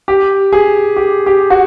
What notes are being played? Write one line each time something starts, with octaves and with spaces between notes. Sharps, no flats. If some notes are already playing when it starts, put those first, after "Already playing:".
G4
G#4
G4
G4
F#4